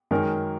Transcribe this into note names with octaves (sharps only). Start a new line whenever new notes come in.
F#2 D#3 G#3 A#4